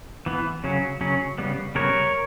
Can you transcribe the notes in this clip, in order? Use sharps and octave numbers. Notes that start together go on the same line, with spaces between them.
E3 B3
C#3 F#3 C#4
C#3 F#3 C#4
C#3 G3 B3
C#3 G3 B3 A#4 C#5